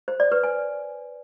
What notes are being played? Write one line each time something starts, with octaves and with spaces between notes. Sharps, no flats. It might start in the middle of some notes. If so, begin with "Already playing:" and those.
C5
D5
B4
G#5